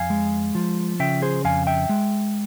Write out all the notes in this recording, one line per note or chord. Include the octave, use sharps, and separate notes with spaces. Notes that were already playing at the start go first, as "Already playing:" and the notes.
Already playing: F2 F5 G#5
G#3
F3
C#3 E5 G5
G#4 C5
F2 F5 G#5
E5 G5
G#3